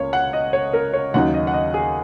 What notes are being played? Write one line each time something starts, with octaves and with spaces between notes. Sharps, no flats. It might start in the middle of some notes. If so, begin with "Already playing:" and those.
Already playing: C#2 C#3 A#3 C#5
F#5
D#5
C#5
A#4
C#5
D#2 C#3 F#3 D#4 F#5
D#5
F#5
D#5
G#4